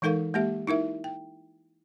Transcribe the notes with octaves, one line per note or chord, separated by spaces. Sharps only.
E3 G#3 D#4 A4 A#4 F5
G#3 A#3 G4 E5
D#4 E4 A#4 E5
G5